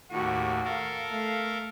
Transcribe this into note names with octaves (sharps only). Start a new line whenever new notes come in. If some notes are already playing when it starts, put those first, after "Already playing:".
D#2 A2 F#4 G4
A4 A#4 F5
A3 F5